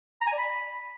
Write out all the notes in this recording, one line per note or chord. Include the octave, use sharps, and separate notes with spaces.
A#5
G#5
D5
B5